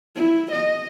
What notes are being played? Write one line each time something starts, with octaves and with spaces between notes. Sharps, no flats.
E4
D#5